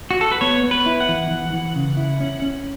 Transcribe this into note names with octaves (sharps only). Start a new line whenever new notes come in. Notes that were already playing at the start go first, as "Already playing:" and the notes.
F#4
A4
B4
B3 C#5
B3
B4
E4
F#5
E3
E3
E3
C#3
E4
C#4
C#4